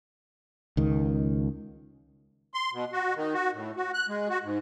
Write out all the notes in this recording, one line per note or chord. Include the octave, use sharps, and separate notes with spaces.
C#2 D#3
C6
B2
F#4
D#3
F#4
A2
F#4
F#6
G#3
F#4
G#2